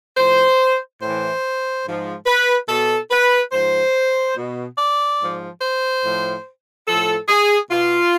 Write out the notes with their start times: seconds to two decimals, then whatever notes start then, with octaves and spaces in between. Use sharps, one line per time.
0.17 A2 F3 C5
1.01 A2 E3 C5
1.85 G#2 F3
2.27 B4
2.69 B2 A4
3.11 B4
3.52 G#2 F3 C5
4.37 B2
4.78 D5
5.19 G#2 F3
5.61 C5
6.03 A2 F3
6.87 A2 F3 A4
7.29 G#4
7.70 B2 F4